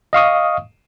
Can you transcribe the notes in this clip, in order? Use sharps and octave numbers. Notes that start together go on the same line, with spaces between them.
D#5 F5 C#6 D#6